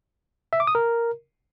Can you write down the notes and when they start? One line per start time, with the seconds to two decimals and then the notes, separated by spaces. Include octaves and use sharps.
0.53 E5
0.60 D6
0.67 D#6
0.75 A#4